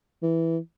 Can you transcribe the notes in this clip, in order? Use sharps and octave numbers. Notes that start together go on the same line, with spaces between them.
E3